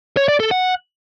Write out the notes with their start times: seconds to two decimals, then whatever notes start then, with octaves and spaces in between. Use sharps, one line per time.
0.17 C#5
0.28 D5
0.40 A4
0.51 F#5